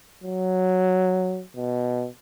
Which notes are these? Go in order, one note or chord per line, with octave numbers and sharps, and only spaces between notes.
F#3
B2